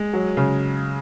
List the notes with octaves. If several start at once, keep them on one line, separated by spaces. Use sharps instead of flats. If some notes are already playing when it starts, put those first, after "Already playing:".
Already playing: G#3
F#3
C#3